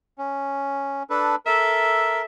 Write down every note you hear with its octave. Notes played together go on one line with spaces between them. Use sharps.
C#4
D4 A4 B4
A4 A#4 E5